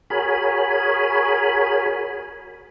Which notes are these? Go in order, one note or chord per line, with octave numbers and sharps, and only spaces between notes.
F#4 G#4 A#4 C#5 G#5 B5